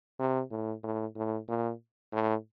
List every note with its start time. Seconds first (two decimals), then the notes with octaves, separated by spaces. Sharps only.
0.19 C3
0.51 A2
0.83 A2
1.16 A2
1.49 A#2
2.12 A2